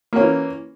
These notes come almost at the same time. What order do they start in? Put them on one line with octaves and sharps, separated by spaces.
A#3 C#4 E3